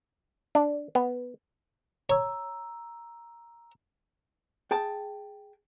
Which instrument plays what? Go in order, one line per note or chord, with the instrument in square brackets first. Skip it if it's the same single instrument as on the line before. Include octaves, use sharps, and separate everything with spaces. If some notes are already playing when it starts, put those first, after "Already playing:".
[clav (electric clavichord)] D4
B3
[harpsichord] C#5 [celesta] A#5 E6
[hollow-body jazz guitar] G#4 G5 A5